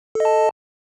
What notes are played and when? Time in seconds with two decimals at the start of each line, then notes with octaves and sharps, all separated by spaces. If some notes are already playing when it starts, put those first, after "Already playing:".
0.15 A4
0.20 D#5
0.25 A5